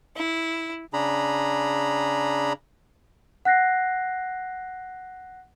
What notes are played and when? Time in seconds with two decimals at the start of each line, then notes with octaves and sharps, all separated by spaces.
0.16 E4
0.93 C#3 D4 G#4 A#5 B5
3.45 F#5 F#6 A#6 C7